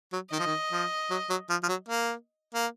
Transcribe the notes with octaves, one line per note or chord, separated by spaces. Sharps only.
F#3
D#3 D#5
F3
D#3
F3
F#3
F#3
F3
F3
F#3
A#3
A#3